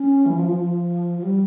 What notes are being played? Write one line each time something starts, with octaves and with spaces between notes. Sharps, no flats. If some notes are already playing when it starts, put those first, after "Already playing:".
Already playing: C#4
E3
F3
F3
F3
F3
G3